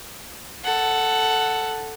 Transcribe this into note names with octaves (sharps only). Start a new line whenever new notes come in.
A4 F#5